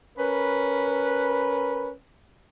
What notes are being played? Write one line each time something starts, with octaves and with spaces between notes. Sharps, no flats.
C#4 A#4 B4